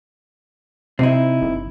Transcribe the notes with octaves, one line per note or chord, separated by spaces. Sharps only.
C3 C4 D#4 E4
G1